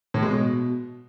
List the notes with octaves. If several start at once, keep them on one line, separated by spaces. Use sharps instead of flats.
A2
G#3
B2